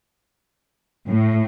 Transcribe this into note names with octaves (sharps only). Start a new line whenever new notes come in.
A2